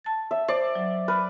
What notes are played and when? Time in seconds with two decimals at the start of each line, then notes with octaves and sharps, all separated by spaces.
0.04 A5 A6
0.31 E5
0.49 C5 D5
0.75 F#3
1.08 B4 F6